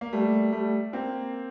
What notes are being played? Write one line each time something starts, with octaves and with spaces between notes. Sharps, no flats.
A#3
G3 A3
G3 A3
A#3 C4